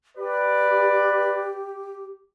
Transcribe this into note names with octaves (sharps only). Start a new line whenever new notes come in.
G4 B4 D5